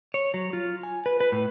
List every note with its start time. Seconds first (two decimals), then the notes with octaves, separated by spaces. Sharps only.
0.14 C#5
0.34 F#3
0.53 F4
0.83 G#5
1.06 B4
1.20 B4
1.32 A2